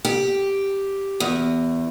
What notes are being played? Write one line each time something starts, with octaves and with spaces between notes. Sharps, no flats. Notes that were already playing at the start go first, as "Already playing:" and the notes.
G4
E2